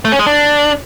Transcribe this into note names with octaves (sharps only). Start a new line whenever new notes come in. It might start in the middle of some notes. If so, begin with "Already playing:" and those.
A3
C#4
G#3
D4